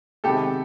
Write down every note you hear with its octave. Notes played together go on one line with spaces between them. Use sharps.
C3 D#3 G#3 B3 G4 A4